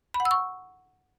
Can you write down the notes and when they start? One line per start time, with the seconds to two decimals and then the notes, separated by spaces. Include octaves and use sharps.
0.14 B5
0.20 F#5
0.25 E6
0.31 C#6